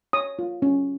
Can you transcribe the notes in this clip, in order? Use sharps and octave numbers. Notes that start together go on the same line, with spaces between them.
C#5 D#6
F4
C#4